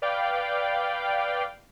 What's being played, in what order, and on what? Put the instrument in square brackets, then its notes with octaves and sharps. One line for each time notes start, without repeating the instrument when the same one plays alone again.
[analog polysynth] B4 D5 F5 G5 D6